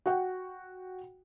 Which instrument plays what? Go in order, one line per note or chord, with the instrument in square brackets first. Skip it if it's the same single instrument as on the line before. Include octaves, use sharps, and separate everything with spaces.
[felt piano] F#4 F#5 G5